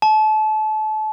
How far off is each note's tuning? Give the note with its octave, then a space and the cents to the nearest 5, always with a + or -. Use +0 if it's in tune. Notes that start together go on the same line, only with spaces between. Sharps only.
A5 -30